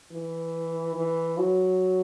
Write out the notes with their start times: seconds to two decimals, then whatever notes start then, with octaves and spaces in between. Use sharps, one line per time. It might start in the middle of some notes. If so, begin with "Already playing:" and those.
0.11 E3
0.95 E3
1.38 F#3